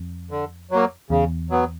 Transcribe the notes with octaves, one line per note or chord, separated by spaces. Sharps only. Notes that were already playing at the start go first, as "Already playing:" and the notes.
Already playing: F2
D3
F#3 A#3
E2 C#3
F#3 B3